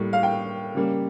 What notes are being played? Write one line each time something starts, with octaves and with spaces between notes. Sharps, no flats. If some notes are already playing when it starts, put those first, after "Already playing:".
Already playing: A2 G3 A#3
F5
G5
C#3 G3 A#3